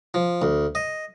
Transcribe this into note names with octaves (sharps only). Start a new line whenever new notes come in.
F3
D2
D#5